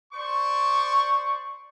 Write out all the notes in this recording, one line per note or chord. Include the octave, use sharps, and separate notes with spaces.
C5 D5 C#6